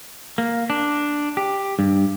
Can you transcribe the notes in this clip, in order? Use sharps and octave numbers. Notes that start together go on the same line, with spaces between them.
A#3
D4
G4
G2